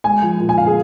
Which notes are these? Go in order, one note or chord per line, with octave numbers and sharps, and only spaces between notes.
G#3 G#5
F3
A#2
G#5
A#2 F5
G#4